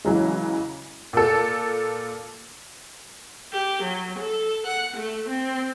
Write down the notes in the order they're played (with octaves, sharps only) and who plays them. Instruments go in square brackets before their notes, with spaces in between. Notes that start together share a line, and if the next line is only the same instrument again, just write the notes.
[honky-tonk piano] C#3 E3 F#3 G#3
A#2 A4
[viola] G4
F#3
A4
F#5
A3
C4